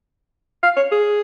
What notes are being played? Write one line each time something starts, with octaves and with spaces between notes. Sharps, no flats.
F5
C#5
G#4